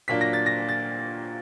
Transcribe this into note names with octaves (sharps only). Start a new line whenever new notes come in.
A#2 F#3 A#3 D4 B6
A#6
A6
A#6
A6